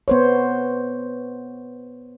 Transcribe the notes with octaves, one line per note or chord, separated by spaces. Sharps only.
B3 C5 C#5